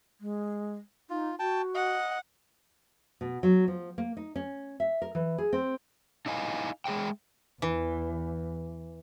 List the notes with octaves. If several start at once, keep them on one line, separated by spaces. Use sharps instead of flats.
G#3
D#4 F4
F#4 G5 A5
D#5 F#5
B2
F#3
F3
A#3
D#4
C#4
E5
A#4
E3
G#4
C4
D#4 E4 D#5 F5 G#5
G#3 G#4 E5 G5
E2 E3